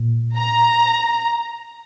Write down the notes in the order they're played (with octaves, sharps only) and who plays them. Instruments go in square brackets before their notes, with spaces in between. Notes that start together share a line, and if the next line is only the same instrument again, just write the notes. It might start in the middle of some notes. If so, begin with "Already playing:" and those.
Already playing: [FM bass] A#2
[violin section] A#5